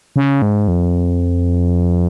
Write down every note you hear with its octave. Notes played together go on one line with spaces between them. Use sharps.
C#3
G#2
F2